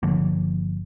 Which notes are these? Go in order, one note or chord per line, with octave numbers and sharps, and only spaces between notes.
G1 D3 F3 A#3